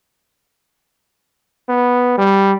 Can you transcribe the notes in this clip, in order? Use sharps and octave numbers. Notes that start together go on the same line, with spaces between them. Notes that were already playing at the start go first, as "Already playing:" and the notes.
B3
G3